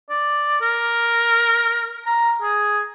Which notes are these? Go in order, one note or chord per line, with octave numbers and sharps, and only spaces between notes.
D5
A#4
A#5
G#4